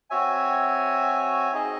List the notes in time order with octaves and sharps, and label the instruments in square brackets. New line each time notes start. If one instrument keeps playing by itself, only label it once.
[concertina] C4 F#4 C#5 E5 G#5
C4 D#4 G#4 D#5